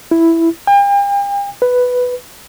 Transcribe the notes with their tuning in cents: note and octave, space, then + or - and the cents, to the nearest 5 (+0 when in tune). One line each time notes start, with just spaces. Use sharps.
E4 +5
G5 +45
B4 +5